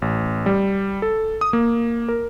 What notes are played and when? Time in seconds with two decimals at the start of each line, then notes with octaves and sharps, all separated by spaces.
0.02 A1
0.46 G3
1.02 A4
1.41 D#6
1.53 A#3
2.09 A#4